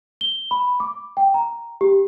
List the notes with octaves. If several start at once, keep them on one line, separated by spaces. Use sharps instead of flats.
G7
B5
D6
G5
A#5
G4